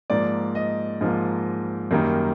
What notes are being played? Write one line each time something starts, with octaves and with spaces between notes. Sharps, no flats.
G#2 F3 A#3 D5
D#5
G#2 F3 A#3
F#2 D#3 G3 A#3